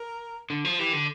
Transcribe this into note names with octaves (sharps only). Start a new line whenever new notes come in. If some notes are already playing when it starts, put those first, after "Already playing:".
Already playing: A#4
D3
F3
E3 G4
D3